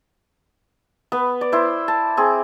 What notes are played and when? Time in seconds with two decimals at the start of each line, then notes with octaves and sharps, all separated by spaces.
1.12 B3 B4
1.41 D5
1.52 E4 C5
1.88 A5
2.17 C4 G#4